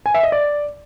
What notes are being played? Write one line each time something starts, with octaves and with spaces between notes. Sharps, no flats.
G#5
E5
D#5
D5